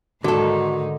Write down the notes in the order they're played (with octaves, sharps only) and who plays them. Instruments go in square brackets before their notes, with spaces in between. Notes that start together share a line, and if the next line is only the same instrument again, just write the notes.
[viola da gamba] G#2 D#3 D#4 [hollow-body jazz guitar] D3 A4 [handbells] F#4